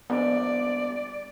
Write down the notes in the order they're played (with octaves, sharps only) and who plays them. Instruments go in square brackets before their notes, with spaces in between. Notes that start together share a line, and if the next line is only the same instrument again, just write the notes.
[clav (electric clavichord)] A#1 G#2 [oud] G3 C#4 [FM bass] B3 [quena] D5